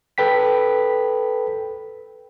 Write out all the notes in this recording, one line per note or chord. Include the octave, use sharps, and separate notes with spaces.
A4 B4 G5 B6